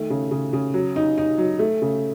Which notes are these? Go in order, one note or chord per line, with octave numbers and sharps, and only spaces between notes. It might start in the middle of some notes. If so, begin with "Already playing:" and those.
Already playing: D#3 A3
C#3
C#3
C#3
F#3
D#4
D#4
F#3
A3
C#3